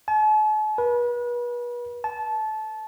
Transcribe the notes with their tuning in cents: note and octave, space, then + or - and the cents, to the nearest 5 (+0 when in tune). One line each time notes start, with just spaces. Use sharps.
A5 -45
B4 -35
A5 -20